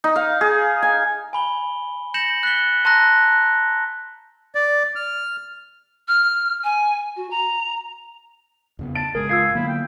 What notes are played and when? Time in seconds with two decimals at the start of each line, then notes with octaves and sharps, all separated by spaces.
0.04 D#4
0.16 F5
0.41 G#4
0.82 G#5
1.33 G#5 B5 G7
2.14 G6 A#6 C#7 E7 F#7
2.43 F#6 A6 B6 C#7 G7
2.85 A5 A#5 C6 E6 F#6 A#6
3.32 F#6
4.55 D5
4.95 F6
6.08 F6
6.64 G#5
7.16 F#4
7.30 A#5
8.79 E2 C#3 B3
8.95 A5 D7
9.15 G#1 C#3 G#3 G#4 A#4
9.29 F4 E6 G#6 C7
9.55 D3 F#3 A#3 B3 E4
9.68 G5